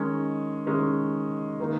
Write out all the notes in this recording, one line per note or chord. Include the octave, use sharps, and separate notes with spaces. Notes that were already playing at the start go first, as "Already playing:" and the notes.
Already playing: D#3 G#3 C#4
D#3 G#3 C#4
D#3 A#3 D#4